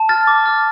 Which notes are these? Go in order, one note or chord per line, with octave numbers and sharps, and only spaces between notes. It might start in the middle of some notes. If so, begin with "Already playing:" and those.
Already playing: A5
F6 A6
D6
F6